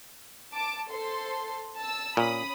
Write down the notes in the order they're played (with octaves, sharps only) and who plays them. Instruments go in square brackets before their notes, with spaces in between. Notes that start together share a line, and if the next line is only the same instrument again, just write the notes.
[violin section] A5 D6
A4 C5 C6
A5 E6
[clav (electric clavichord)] A#2 [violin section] C#4 B5 D#6